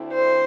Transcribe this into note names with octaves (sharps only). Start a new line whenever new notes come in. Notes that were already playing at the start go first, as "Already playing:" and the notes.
Already playing: D2 D3 A3 C4 E4
C5